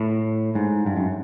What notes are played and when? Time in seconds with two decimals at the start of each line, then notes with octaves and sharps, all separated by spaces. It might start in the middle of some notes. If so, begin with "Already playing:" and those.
Already playing: A2
0.55 G#2
0.86 G2
0.96 F#2